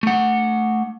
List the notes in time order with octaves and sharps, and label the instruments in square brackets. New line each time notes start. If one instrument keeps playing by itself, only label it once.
[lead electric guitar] A3 F#5